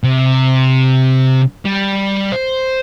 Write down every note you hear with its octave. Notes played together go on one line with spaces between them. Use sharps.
C3
G3
C5